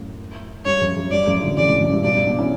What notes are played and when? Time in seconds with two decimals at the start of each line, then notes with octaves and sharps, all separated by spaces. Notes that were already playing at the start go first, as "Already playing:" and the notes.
Already playing: F#2 A2
0.66 G2 C#5
0.81 F#2
0.96 F#2
1.11 G2 D5
1.27 F#2 A2
1.42 D3 F#3
1.57 C#3 E3 D5
1.69 A2 C#3
1.81 F#2 A2
1.92 G2
2.04 G2 B2 D5
2.26 B3 D4
2.39 C#4 E4